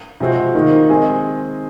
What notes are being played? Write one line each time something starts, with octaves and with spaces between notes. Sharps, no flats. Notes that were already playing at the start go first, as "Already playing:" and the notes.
C3 F3 G#3 C4 F#4
D#3 A#3 D#4
G#3 C4 D#4 G#4 D#5